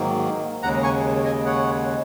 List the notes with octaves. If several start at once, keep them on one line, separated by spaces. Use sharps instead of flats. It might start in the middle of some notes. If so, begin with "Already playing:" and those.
Already playing: G#2 D#3 F#3 A#3
D#2 C#3 G#3 F#5 A#5
G#5 C#6
D#5 G#5
C#5 F#5